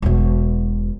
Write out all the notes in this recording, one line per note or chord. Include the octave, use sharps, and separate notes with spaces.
E1 B2